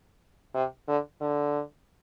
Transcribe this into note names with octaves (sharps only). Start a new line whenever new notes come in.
C3
D3
D3